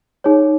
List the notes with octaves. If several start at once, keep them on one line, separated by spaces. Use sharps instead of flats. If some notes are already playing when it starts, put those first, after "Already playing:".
D#4 G#4 C#5